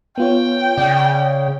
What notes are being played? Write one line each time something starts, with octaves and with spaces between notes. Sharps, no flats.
B3 F4 C#5 G5
C#3 D5